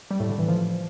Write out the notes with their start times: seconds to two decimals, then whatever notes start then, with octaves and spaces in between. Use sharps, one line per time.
0.11 G3
0.20 A2
0.29 D3
0.39 E3
0.48 F3